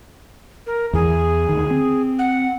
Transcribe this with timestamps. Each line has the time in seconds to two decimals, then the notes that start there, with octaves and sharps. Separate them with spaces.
0.67 A#4
0.93 E2 E3 G#4
1.49 D2 D#3
1.71 C4
2.19 F#5